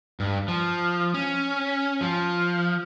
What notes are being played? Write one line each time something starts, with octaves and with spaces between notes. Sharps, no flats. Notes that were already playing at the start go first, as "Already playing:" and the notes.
G2
F3
C#4
F3